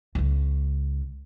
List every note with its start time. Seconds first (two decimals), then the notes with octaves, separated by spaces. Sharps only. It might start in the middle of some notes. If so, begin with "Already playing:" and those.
0.15 C#2 C#3